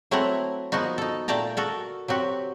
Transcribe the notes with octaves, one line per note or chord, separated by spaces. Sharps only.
F#3 A3 C4 E4 F#5 A#5
F3 A#3 B3 D#4 F#4
D#4 A4
A#2 A3 D5 G5 A5 A#5
F#4 A4 A#4
F#3 C4 F#4 G4